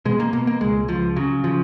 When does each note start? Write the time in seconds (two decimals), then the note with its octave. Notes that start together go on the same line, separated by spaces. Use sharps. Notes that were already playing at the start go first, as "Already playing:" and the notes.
0.05 B2 G#3
0.20 A#3
0.33 B2 A#3
0.47 A#3
0.61 C#2 G#3
0.88 C#2 F3
1.16 C#3 F#3
1.44 C#3 F3